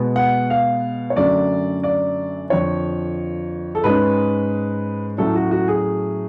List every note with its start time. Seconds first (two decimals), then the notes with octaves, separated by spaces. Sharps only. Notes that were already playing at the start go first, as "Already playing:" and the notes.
Already playing: B2 G#3 B3
0.16 F#5
0.50 F5
1.10 C#5
1.16 F#2 D3 F#3 A3 C#4 D5
1.84 D5
2.50 F2 D3 F3 C#5
3.75 A4
3.84 G#2 G#3 C#4 B4
5.18 A2 F#3 A3 C#4 A4
5.35 F#4
5.51 F#4
5.68 G#4